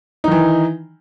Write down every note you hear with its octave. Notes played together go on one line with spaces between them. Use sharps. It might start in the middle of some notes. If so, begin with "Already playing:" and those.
D#3 E3 D#4